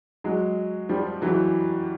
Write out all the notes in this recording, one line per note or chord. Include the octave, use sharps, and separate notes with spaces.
F#3 G#3
F3 G3
E3 F#3